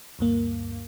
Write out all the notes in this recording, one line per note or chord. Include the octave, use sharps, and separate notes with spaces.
D2 G2 A#3